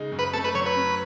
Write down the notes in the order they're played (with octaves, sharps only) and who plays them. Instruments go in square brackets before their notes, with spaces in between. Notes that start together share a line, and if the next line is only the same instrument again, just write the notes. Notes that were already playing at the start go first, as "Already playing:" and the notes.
Already playing: [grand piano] C#3 G#3 D#4
F#2
[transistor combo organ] B4
[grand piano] A3 [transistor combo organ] A4
[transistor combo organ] B4
[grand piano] F#3 [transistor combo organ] C#5
[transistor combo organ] B4
[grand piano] C#4